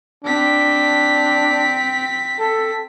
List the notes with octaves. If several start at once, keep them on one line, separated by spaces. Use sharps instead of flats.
C4 D4 B6
A4